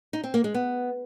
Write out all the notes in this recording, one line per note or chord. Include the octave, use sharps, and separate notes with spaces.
D#4
C4
A#3
G#3
B3